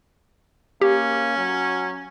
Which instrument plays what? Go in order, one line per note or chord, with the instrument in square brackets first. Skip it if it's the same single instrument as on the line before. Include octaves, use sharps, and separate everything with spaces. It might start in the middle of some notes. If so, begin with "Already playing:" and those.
[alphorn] A#3 [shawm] C#4 [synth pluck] G4
[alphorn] F#3